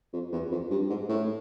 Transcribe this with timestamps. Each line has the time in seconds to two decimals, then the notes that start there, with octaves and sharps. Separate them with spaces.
0.13 F2
0.32 E2
0.51 F2
0.70 G2
0.90 G#2
1.09 A2